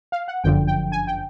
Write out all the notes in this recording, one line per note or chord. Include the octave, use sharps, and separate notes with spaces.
F5
F#5
G1 F#2 D3 F3 G5
G5
G#5
G5